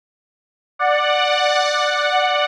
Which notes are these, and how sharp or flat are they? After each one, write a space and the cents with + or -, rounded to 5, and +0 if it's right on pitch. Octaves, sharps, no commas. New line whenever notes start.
D5 +10 F#5 -5